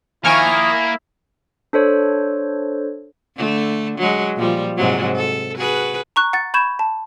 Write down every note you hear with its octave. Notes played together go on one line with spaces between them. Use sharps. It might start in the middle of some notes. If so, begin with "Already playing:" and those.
D#3 F3 A#3 E4 G#5 C#6 F6
D4 A4 C5 C#5
D3 A3
F#3 G#3
A#2 F3 G3
G#2 C3 F#3
A4
F#4 G#4 B4
A#5 C#6 F#6
F#5 A6
B5 C#6 G6 G#6 E7
A5